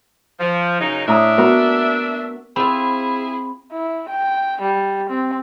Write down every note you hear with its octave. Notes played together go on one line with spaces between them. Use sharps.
F3
F#2 C#3 D#4
A2 D4 E5 A#5 D#6
B3 F#4 A#4
C4 E4 F4 G#4 B5
E4
G5
G3
C4